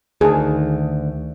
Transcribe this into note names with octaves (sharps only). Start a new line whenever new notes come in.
D2 D#3 G#4 A5